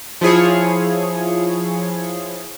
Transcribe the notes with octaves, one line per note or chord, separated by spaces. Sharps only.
F3 E4 G#4 C#5